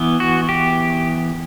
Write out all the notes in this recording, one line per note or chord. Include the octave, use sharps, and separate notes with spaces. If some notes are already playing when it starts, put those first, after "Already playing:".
Already playing: E3 B3
F#4
G4